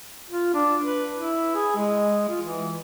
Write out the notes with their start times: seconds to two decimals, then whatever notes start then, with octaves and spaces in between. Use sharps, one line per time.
0.31 F4
0.54 D4
0.83 B4
1.15 E4
1.55 G#4
1.76 G#3
2.30 F4
2.42 E3